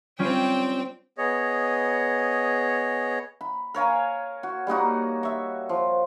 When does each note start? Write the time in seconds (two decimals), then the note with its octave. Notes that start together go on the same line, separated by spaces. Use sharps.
0.19 G3 C4 C#4 F4 G5
1.18 B3 G#4 C#5 D#5
3.41 B5
3.74 A#4 C#5 F5 G#5
4.43 F#4
4.67 G3 A#3 D#4 F#4
5.23 E5 C#6
5.69 F3